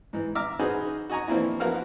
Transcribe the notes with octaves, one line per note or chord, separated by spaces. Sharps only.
G#2 E3
E5 A#5 D6 F6
D#4 F#4 G#4 B4 C5
F#4 D#5 G#5 A#5 C#6
E3 F3 A#3 C4 D4 E4
F3 B3 E4 F#4 A#4 F5